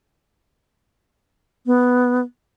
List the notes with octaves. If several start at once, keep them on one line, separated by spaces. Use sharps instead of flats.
B3